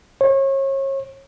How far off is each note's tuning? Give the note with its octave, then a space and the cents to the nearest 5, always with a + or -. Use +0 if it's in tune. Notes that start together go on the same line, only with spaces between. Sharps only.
C#5 -35